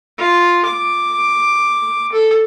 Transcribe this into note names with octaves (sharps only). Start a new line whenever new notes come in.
F4
D6
A4